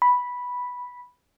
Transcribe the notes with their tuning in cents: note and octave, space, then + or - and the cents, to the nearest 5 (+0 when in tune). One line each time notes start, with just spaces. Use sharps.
B5 -5